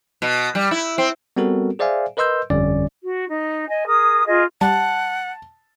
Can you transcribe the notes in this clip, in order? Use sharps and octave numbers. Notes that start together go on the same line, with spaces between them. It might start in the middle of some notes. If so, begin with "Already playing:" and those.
B2
G3
E4
C4
G3 B3 C4 F#4 A4 A#4
G#4 C5 D5 E5 F5 G#5
A#4 B4 D#5 C6 E6 G6
G1 F2 D3 G3 C#4 D5
F#4
D#4
D#5 G#5
G#4 A#4 D#6
F4 G#4 D#5
G3 F#5 A5